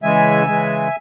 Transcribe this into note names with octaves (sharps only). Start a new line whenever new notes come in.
C#3 E3 G#3 E5 G#5
C#3 E3 G#3